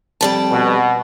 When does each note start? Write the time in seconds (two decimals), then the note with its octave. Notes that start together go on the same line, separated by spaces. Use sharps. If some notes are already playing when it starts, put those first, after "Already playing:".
0.21 F2 G3 A5
0.51 B2